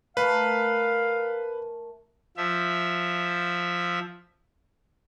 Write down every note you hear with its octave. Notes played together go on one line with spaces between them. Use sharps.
A3 A#4 B4 F5 G#5
F3 E5